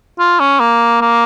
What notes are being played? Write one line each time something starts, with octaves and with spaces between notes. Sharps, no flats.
F4
C#4
A#3
A#3